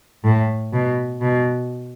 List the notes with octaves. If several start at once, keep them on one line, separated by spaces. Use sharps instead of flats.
A2
B2
B2